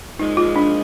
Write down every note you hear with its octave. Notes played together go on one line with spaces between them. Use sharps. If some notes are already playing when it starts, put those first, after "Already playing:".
A#2 F3 G#3 D#4
F4
D4